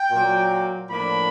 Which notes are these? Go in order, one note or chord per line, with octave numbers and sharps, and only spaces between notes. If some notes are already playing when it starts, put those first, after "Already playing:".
Already playing: G5
A#2 F#3 A#3
A2 F3 A#3 D4 B5